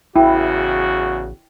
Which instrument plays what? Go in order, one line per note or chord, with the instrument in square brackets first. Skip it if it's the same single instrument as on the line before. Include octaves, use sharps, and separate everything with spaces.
[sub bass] A1 [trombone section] E2 C#3 F#4 [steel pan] E4 [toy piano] G5